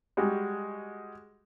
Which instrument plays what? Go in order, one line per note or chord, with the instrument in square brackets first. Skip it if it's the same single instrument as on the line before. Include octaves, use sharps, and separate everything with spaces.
[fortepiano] G3 G#3 F#4